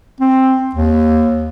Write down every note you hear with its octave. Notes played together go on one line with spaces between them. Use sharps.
C4
D#2